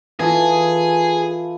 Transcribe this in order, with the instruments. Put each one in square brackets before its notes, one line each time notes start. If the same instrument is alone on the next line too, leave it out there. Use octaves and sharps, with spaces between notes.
[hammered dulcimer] E3 F4 A4 [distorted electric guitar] G#4